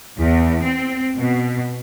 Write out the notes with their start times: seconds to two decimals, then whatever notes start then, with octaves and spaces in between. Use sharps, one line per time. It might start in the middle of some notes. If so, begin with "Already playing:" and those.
0.19 E2
0.63 C4
1.17 B2